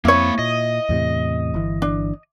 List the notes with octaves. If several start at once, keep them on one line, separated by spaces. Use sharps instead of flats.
F2 A#3 C4 E4 C#5 B5
A#2 D#5
E2 A2 C3
G1 E3
D4